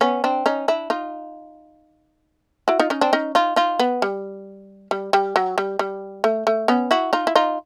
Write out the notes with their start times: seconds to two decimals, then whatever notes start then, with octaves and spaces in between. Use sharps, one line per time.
0.01 B3 C#4
0.24 C4 D4
0.46 C#4 D#4
0.68 D4 E4
0.90 D#4 F4
2.68 E4 F#4
2.80 D#4 F4
2.90 C#4 D#4
3.01 C4 D4
3.13 C#4 D#4
3.35 D#4 F4
3.56 D#4 F4
3.80 B3
4.02 G3
4.91 G3
5.13 G3
5.36 F#3
5.58 G3
5.79 G3
6.24 A3
6.47 A3
6.68 B3 C#4
6.91 E4 F#4
7.13 D#4 F4
7.27 E4
7.36 D#4 F4